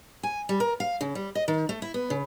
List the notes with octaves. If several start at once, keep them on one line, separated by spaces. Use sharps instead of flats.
G#5
G3
A#4
F5
C#3
G3
D#5
D#3
A3
E4
B3
C#3